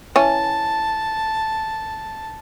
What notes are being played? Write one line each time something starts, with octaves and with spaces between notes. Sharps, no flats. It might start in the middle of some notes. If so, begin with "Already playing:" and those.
E3 C#4 A5